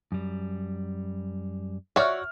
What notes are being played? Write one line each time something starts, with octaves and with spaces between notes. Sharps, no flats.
F#2 G3
F#4 C#5 D5 E5 C#6 F6